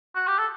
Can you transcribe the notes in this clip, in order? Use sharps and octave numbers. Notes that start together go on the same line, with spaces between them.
F#4
G4
A4